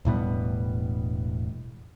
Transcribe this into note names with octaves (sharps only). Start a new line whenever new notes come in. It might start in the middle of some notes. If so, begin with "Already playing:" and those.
E1 A2 G3 B3